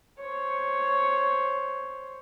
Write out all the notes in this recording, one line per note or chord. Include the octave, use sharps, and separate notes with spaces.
C5 C#5